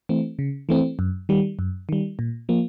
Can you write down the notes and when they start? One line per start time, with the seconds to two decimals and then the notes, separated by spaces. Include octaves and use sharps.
0.09 E3 A3 C4
0.39 C#3
0.69 E3 A3 C4
0.99 F#2
1.29 D#3 G3
1.59 F#2
1.89 D#3 G3
2.19 A#2
2.49 F3 A#3